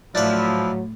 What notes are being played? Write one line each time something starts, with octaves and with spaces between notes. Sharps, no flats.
A2 F3 F#3 D4 E4 B4